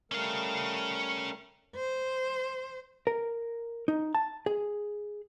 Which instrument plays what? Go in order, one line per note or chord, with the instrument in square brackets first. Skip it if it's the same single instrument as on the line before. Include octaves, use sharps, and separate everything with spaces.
[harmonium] G3 A3 A#4 [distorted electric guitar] C#4 F5
[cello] C5
[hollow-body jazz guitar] A#4
D#4
A5
G#4